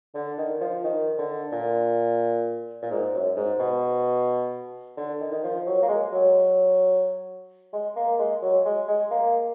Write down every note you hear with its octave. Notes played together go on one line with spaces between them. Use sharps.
D3
D#3
F3
D#3
D3
A#2
A#2
G#2
F#2
G#2
B2
D3
D#3
D#3
F3
F#3
A#3
G#3
F#3
G#3
A#3
G#3
F#3
G#3
G#3
A#3